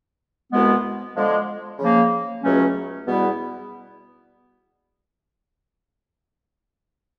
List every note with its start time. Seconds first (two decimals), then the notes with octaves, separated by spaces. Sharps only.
0.52 C2 B2 G#3 B3
1.16 D3 F3 G#3
1.79 C#3 F3 A#3
2.43 C#2 B2 F#3 A3 C#4
3.06 E2 B2 G3 B3 E4